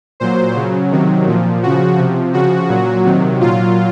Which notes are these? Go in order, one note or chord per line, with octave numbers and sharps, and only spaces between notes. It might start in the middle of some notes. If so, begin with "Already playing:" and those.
A#2 F#3 C5
C#3 F#3
C3 D#3 F#3
A#2 F3
C#3 F3 F#4
C3 F3
C#3 F3 F#4
A#2 F#3 F#4
C3 D#3 F#3
A#2 F#3 F4